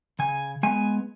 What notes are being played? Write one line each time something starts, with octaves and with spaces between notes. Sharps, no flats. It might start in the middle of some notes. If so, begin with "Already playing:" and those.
C#3 G#5
G#3 B3 G#5